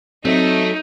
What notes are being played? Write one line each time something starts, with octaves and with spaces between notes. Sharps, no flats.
F#3 A3 C4 D#4 E5